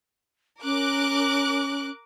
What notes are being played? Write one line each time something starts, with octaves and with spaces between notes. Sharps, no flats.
C#4 A#4 D6 F#6